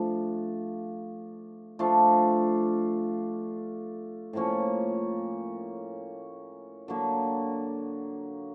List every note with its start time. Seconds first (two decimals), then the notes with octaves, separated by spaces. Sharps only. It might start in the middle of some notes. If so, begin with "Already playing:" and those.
Already playing: F3 A3 D4 F4
1.79 F3 A3 D4 F4
4.33 A2 F3 A#3 C#4
6.88 D3 F#3 A#3